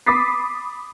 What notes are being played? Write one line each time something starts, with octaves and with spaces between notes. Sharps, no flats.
B5 D6 D#6 A6 B6 C7